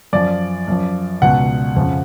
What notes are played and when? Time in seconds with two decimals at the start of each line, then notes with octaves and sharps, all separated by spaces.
0.13 F#2 F3 D5
0.68 F#2 F3
1.22 C#2 B2 F#5
1.76 F2 C#3 F3